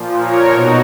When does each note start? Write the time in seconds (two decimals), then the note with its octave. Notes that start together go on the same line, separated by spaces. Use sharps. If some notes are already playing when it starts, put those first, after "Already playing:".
Already playing: A#2 F3
0.21 A#4 C#5
0.52 B2 D#4 F#4